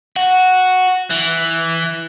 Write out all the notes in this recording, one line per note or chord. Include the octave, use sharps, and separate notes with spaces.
F#4
E3